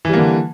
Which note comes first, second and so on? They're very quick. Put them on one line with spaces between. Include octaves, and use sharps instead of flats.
E3 G3 A#3 D3